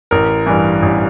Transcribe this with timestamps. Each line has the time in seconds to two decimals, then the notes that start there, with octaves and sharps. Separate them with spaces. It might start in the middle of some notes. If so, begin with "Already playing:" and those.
0.11 A1 A#4
0.46 G2 E3
0.82 A1